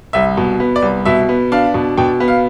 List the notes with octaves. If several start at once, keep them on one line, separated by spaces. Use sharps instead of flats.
C2 E5
B2
B3
D5
C2
B2 E5
B3
D4 F5
B2
B2 G5
B3
F5